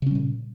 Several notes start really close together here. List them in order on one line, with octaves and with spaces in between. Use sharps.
C#3 C#4 G3 A#2